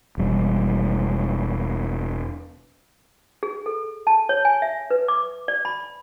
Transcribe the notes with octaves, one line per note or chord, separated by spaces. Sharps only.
E1 G3
G#4
A4
A5
C#5
G#5
E5
B4
D6
D5
B5